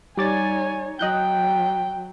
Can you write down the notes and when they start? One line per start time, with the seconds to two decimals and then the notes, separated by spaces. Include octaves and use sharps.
0.17 G3 D#4 C#5 D5 G#5 A6
0.99 F#3 D#5 G5 F#6 G6